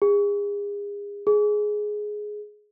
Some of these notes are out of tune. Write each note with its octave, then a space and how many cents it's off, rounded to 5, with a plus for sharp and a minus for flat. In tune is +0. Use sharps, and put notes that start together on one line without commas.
G#4 -35
G#4 +10